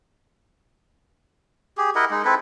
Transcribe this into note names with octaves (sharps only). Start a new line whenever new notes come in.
G4 G#4
E4 A#4 D#5 F#5
G#3 D#4
C4 E4 A4 B4